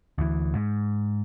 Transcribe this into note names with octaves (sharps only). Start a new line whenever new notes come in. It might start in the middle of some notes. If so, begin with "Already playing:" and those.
D2 E3
G#2